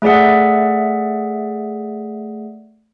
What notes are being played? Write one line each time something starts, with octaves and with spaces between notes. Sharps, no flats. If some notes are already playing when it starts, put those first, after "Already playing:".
A3 G#4 D5 E5 F#5